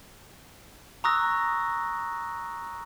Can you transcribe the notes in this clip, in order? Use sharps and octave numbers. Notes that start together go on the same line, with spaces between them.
A#5 C#6 D#6 E6 F#6 A#6